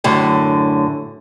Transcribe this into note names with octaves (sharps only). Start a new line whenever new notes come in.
F#2 A2 D3